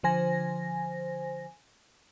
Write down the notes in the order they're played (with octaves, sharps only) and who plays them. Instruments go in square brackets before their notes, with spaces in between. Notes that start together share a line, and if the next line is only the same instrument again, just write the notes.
[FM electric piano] D3 F3 C5 G#5 A#6